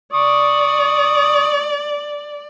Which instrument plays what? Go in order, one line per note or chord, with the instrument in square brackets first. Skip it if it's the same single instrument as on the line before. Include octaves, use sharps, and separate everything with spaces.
[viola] D5 [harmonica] C#6 D#6